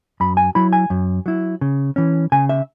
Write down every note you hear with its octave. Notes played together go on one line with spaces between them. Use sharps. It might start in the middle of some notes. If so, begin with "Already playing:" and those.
F#2 B5
G#5
F#3 E4 B5
G#5
F#2
F#3 E4
C#3
E3 C#4
C#3 G#5
E5